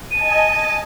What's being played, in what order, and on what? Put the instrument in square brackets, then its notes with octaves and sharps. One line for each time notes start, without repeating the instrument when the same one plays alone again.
[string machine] D#5 G#5 A5 [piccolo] D#7